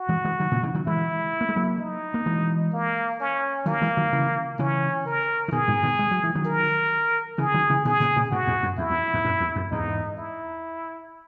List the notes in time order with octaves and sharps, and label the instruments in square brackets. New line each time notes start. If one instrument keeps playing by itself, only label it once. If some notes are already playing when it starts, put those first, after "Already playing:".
Already playing: [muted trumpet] F#4
[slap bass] E3 G#3
E3 G#3
D#3 F#3
A#2 C#3
C#3 E3
D#3 F#3
[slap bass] E3 G#3 [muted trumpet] E4
[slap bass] A#3
G#3
F#3 A#3
[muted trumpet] D#4
[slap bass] A#3
E3 G#3
[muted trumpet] A#3
C#4
[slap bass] D#3 F#3 [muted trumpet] A#3
[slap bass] E3 G#3
D#3 F#3
C#3 E3
[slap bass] C#3 E3 [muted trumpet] C#4
[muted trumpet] A#4
[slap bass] E3
[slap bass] B2 D#3 [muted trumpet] G#4
[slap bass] G#2 B2
B2 D#3
G#3
F#3
E3
D#3 F#3
[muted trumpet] A#4
[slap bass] C#3 E3 [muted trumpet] G#4
[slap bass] D#3 F#3
C#3 E3
[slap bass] B2 D#3 [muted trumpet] G#4
[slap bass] A#2 C#3
A#2 C#3
[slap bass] G#2 B2 [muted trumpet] F#4
[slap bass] E2 G#2
F#2
[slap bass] E2 [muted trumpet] E4
[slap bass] E2
E2 G#2
F#2 A#2
E2
F#2
[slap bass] E2 G#2 [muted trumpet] D#4
[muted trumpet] E4